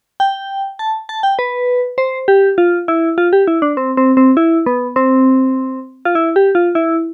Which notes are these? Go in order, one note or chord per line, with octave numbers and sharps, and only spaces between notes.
G5
A5
A5
G5
B4
C5
G4
F4
E4
F4
G4
E4
D4
C4
C4
C4
E4
B3
C4
F4
E4
G4
F4
E4